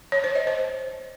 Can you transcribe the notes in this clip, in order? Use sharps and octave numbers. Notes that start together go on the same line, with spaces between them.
C#5
C5
D#5
C5